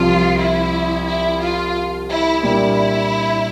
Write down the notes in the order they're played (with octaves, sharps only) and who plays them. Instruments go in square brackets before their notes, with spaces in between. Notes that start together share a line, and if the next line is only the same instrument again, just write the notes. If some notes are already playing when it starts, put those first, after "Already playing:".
Already playing: [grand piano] C2 C3 F3 [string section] F4
[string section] E4
E4
F4
E4
[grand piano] A#2 G3 A#3 D4 [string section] E4